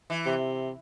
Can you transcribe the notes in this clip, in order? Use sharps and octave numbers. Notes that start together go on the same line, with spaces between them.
E3
C3